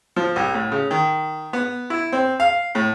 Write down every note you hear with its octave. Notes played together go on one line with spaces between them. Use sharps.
F3
C2
A2
C#3
D#3
B3
E4
C4
F5
A2